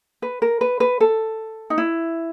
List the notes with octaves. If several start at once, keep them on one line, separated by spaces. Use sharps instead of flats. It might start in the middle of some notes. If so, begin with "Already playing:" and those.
B4
A#4
B4
B4
A4
D#4
E4